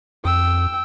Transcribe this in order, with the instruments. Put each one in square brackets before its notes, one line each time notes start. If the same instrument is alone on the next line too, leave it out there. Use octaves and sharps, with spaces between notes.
[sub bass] F2 [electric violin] G5 E6